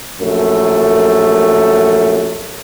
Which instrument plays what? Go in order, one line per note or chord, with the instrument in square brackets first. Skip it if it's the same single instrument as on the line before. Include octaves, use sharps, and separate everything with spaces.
[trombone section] A#1 F#2 A3